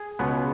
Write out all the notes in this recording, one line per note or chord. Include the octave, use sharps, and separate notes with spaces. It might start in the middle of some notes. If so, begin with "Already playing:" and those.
Already playing: G#4
C#2 B2 G#3 B3